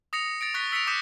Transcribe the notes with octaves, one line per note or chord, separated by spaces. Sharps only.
D#6 A#6 C#7 F7
A6 A#6 D7
C#6 F#6 A6 B6
E6 B6 C#7 D7 F7
D6 D#6 G6 B6 C#7 E7